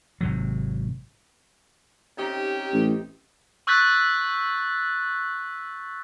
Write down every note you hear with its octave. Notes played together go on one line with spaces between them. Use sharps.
G#1 C3 F#3
C3 C#4 D#4 G4 A#5
A1
C#6 E6 F#6 G6 A6 B6